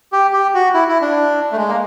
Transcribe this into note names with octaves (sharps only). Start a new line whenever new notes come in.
G4
G4
F#4
E4
E4
D4
A3
G#3
A#3